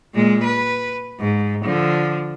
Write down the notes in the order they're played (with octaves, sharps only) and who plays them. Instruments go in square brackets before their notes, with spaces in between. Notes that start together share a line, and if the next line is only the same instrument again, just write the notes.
[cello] A#2 G#3
B4
G#2
D3 F3